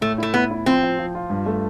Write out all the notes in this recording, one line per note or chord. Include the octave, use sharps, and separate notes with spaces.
A2 A3
A3 E4
B3 E4
E4
F3 C4
F3
F3
F4
G2
A3